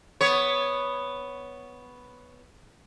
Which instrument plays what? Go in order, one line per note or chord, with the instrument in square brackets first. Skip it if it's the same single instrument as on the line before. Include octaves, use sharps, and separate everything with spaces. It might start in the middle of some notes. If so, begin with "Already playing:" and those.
[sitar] B3 C#5